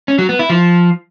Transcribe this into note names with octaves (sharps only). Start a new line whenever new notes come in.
C#4
F#3
B3
E4
F3